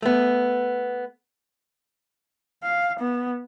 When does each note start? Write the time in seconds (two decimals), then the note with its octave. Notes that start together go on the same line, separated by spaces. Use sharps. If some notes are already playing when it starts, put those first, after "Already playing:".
0.02 A3 B3
2.63 F5
3.00 B3